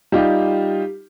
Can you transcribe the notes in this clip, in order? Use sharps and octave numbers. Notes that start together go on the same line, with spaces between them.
G3 D#4 F4 G4